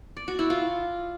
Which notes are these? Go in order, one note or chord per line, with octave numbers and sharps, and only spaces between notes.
D5
F#4
E4
F4